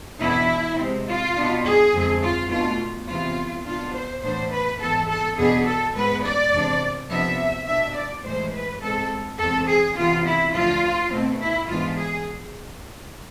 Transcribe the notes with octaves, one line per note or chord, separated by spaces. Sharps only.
E2 B2 B3 D4 E4
C3 G#3 C4
F4
B2 B3 D4
G#4
F2 D3 G#3 C4
F4
B2 A3 D4 F4
E2 C3 E3 B3 F4
B2 B3 D4 F4
C5
A2 E3 B3 D4 C5
B4
G#2 E3 B3 A4
A4
E2 B2 B3 D4 G#4
A4
G#2 G#3 B3 B4
D5
E2 C3 G#3 D4
C3 F3 B3 D4 E5
B2 B3 D4 E5
D5
A2 E3 G#3 C5
B4
G#2 G#3 C4 A4
E2 C3 G#3 C4 A4
G#4
C3 E3 B3 F4
E4
D2 D3 F3 F4
B2 A3 C4
E4
G#2 E3 G#3 B3 D4 F4
G#4